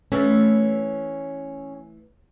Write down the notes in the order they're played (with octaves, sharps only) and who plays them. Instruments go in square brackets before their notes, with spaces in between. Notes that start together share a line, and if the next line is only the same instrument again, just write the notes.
[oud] E3 A3 [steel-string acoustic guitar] C#4